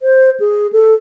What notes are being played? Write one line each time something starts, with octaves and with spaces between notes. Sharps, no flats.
C5
G#4
A4